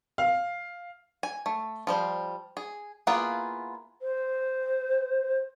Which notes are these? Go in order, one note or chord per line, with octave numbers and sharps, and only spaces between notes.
F5
G#5
A3
F3 G3 C5
G#4
A#3 B3 E4 F4 G#4
C5